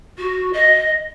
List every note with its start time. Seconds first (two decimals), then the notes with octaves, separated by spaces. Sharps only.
0.18 F#4
0.53 D#5